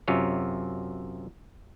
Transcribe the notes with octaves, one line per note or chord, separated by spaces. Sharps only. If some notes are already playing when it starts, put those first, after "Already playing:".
F#2 C3 F4 C#5